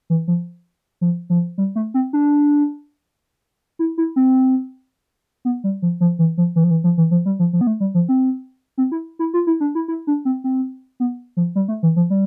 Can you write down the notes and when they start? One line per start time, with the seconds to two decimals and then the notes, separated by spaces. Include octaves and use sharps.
0.10 E3
0.28 F3
1.01 F3
1.30 F3
1.58 G3
1.76 A3
1.94 C4
2.13 D4
3.79 E4
3.98 E4
4.16 C4
5.45 B3
5.64 G3
5.82 F3
6.01 F3
6.19 E3
6.38 F3
6.56 E3
6.64 F3
6.70 E3
6.84 F3
6.98 E3
7.11 F3
7.26 G3
7.39 F3
7.53 F3
7.61 B3
7.67 A3
7.80 G3
7.94 F3
8.09 C4
8.78 C4
8.92 E4
9.19 E4
9.34 F4
9.47 E4
9.61 D4
9.75 E4
9.88 E4
10.07 D4
10.25 C4
10.44 C4
11.00 B3
11.37 F3
11.55 G3
11.68 A3
11.83 E3
11.96 F3
12.10 G3